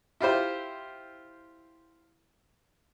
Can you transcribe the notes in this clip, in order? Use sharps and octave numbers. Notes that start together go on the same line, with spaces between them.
E4 F4 G4 C5